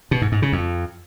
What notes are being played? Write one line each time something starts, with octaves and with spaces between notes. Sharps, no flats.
B2
G#2
G#2
C#3
F2